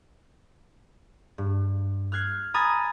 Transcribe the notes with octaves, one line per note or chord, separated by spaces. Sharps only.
G2
F6 F#6 G#6 C7
G#5 A#5 B5 D#6 G#6 A6